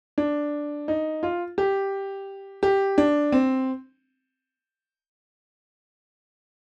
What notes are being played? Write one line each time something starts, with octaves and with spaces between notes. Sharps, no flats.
D4
D#4
F4
G4
G4
D4
C4